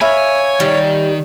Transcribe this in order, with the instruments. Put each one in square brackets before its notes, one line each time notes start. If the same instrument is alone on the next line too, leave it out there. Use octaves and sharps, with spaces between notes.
[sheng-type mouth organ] C#5 [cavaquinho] E5 F5 B5 [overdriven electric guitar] G#5
[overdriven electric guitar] D#3 [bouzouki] G3